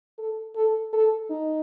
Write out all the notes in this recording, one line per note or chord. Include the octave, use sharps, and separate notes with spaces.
A4
A4
A4
D#4